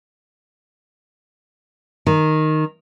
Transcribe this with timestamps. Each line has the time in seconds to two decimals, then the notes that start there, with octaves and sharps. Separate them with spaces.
2.06 D#3